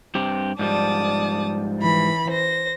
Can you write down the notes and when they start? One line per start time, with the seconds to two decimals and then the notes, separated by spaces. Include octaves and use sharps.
0.15 G2 C4 G4
0.59 G#2 F3 G3 D5 A5 D#6
1.79 E3 B5
2.30 C5 A#6